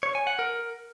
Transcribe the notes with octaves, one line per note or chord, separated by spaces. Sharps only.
C#5
G#5
F#5
A#4